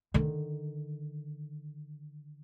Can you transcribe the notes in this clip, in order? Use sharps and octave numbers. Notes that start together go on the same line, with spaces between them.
D3 D#3